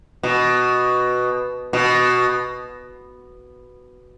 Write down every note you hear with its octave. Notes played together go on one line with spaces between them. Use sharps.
B2
B2